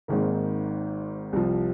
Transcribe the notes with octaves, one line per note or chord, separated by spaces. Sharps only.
G#1 G#2 D#3 A#3
C2 C3 F3